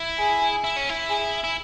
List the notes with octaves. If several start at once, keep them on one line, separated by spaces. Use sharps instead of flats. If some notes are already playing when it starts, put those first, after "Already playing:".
Already playing: E4
G#4
E4
C#4
E4
G#4
E4